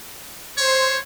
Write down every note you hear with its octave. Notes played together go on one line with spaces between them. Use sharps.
C5 C#5